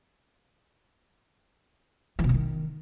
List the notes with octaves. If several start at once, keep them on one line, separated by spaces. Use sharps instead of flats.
E3
B2
F3
D#3